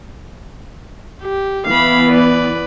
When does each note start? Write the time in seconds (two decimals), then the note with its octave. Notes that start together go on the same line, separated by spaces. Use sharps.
1.22 G4
1.67 E3 B3 F5 B5
2.09 B4 D5